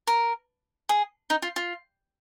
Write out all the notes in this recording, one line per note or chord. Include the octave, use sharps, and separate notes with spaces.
A#4
G#4
D#4
F4
F4